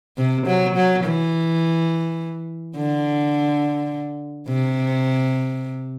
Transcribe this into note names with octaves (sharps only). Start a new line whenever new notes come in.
C3
F#3
F#3
E3
D3
C3